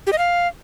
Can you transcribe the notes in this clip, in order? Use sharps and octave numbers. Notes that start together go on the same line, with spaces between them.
G4
D#5
F5